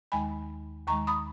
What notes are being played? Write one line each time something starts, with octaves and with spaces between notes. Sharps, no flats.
D#2 D#3 G#3 G#5 B5
D#2 D#3 G#3 A#5 C#6
B5 D#6